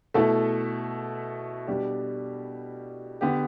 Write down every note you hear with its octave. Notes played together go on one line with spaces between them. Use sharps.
B2 A3 E4 A4 E5
B2 G3 D4 G4
D3 B3 G4